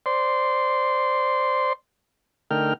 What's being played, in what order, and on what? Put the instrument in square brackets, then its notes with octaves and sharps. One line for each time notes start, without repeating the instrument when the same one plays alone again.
[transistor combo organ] C5 D5 C6
D3 A3 D#4 A#4 G5 F6